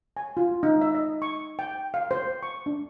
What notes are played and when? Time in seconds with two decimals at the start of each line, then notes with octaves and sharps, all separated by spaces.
0.17 G#5
0.37 F4
0.63 D#4
0.81 E5
0.95 D#5
1.22 C#6
1.59 G5
1.94 F5
2.11 C5
2.43 C#6
2.66 D4